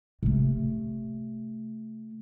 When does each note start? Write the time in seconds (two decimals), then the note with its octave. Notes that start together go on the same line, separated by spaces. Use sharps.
0.23 C3 A3